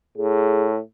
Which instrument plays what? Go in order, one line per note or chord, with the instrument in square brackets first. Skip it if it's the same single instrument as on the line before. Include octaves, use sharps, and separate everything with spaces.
[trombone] A2 [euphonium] G#4